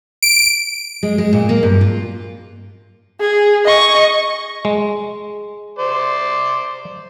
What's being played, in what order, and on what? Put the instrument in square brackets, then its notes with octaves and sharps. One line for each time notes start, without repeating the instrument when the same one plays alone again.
[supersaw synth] D7
[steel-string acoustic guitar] G#3
G#3
A#2
A#3
G2
F4
[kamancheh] G#4
D#5 C#6
[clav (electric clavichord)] G#3
[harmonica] C5 D5